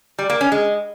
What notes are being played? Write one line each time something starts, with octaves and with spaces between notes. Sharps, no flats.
G3
A#3
C#4
G#3